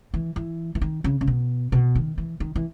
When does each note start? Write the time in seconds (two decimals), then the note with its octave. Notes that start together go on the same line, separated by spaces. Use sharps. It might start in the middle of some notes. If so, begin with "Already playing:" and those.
0.14 E3
0.36 E3
0.75 E3
0.81 D#3
1.04 C#3
1.21 C#3
1.27 B2
1.72 B2
1.95 D#3
2.18 E3
2.40 D#3
2.55 E3